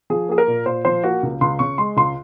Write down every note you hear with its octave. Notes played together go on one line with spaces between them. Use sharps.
F3 G#4
A#3 G#4
A#4
A#2
A#2 C5
F3 C5
A#3 F#4
C#2
C#2 C6
C#3 C#6
G#3 C6
C#2 C6